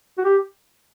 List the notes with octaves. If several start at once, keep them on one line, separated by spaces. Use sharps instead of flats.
F#4
G4